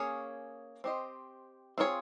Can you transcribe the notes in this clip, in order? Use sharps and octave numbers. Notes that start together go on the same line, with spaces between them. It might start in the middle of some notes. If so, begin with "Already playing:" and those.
Already playing: A#3 C#4 G#4 C#5
C4 G4 C5 D#5
C4 F4 G#4 C#5